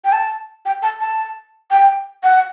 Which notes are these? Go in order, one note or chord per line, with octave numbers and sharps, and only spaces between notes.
G5
A5
G5
A5
A5
G5
F#5